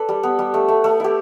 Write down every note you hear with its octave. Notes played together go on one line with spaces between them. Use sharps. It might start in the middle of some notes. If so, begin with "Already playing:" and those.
Already playing: A4 B4 D5
G3
B3
G3
A3
A3
A3
E4 G4